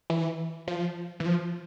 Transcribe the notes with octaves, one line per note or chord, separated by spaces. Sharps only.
E3
F3
E3
F3